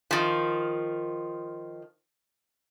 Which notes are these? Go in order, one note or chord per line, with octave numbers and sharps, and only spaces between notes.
D#3 F3